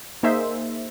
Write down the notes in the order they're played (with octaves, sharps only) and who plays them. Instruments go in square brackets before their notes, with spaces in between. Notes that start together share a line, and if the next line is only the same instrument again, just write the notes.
[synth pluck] A#3 D#4 G#4 C5 E5